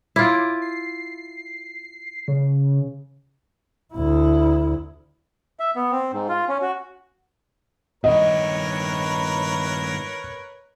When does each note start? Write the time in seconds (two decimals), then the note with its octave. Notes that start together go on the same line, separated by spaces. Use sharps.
0.16 E4 F4 D6
0.62 C7
2.28 C#3
3.94 D2 E4
5.60 E5
5.76 B3
5.92 C4
6.13 G#2
6.29 F4
6.49 C#4
6.62 F#4
8.04 G2 D#3 A#4 B4 C#5 D#5